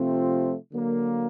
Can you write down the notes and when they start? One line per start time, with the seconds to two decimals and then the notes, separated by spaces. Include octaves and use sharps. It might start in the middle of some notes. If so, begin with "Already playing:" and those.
Already playing: C3 F3 A3 C4 F4
0.72 D3 F#3 A#3